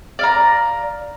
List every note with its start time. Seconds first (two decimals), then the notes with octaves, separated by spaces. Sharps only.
0.19 D5 F5 A#5